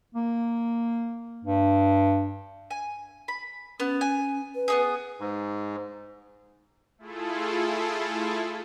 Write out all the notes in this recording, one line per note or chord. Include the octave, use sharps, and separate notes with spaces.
A#3
G2
G#5
B5
B3 C#4
G#5
B4
B3 D#4 G#4
G#2
A3 E4 F4 G#4 A4